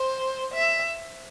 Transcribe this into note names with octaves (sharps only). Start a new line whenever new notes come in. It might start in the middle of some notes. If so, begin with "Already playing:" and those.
Already playing: C5
E5